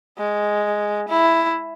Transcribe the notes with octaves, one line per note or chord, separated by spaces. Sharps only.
G#3
E4